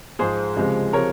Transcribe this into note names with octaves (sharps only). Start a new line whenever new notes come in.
G#2 F3 G#3 G#4 C5
C#2 C3 F3 G#3
C3 F3 G#3 A#4 C#5